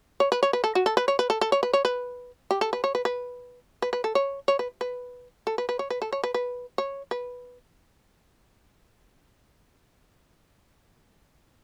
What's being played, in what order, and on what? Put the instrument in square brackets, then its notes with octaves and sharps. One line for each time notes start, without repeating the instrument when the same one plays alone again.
[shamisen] C#5
B4
C#5
B4
A4
F#4
A4
B4
C#5
B4
A4
A4
C#5
B4
C#5
B4
G4
A4
B4
C#5
B4
B4
B4
B4
A4
C#5
C#5
B4
B4
A4
B4
B4
C#5
B4
A4
C#5
B4
B4
C#5
B4